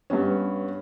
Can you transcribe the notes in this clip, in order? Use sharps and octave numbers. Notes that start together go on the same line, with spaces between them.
G2 G3 B3 C#4